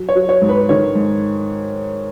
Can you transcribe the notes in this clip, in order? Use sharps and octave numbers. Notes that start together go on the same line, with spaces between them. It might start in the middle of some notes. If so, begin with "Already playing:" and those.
Already playing: F#3
C#5
F#3
C#5
G#2
B4
D#3 C#5
G#2